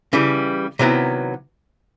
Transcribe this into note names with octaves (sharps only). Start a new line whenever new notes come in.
C#3 E3 G3
C3 D#3 F#3 B3 E4